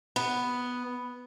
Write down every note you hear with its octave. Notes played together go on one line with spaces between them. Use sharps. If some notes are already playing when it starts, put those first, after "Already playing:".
B3